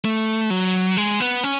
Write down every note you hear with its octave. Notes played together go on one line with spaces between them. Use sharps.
A3
F#3
G#3
B3
C#4